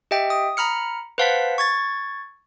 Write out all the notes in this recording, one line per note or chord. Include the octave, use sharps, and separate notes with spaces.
G4 D#5 E5 G5
D#6
A#5 B5 F6 C#7
B4 C5 F5 F#5 A5 B6
C#6 G#6 A6